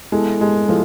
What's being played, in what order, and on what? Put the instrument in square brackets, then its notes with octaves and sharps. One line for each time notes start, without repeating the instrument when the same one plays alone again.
[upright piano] G#3 [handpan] B3 E4 A4
[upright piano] G#3
[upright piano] F3 [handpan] E4 A4